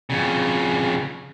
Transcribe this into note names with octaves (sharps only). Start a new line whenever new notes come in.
F2 C#3